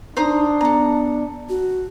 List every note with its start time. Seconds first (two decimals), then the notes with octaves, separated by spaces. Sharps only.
0.17 D4 D#4 C5 A#5 D#6
0.61 B3 A4 A#5
1.49 F#4